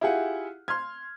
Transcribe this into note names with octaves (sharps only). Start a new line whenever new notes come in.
E4 F4 G4 G#4 F#5
C6 F6 G#6